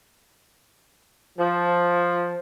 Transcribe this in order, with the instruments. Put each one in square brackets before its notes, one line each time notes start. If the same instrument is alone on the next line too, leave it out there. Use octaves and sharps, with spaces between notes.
[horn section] F3